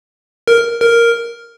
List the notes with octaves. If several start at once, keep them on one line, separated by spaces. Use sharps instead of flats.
A#4
A#4